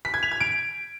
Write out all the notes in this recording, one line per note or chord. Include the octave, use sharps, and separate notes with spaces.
B6
G#6
F7
G#6
D7